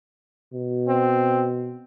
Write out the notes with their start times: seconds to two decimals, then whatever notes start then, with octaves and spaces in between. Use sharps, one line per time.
0.53 B2
0.88 C4